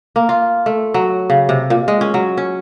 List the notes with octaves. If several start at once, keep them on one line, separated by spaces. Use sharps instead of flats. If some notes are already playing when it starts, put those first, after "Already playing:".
A#3
F4
A3
F#3
C#3
C3
A#2
G#3
C#4
F#3
C#4